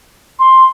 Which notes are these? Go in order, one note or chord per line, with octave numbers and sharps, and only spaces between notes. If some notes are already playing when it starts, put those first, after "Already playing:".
C6